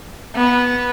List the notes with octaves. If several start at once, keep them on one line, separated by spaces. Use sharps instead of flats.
B3